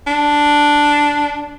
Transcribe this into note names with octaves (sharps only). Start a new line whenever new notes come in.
D4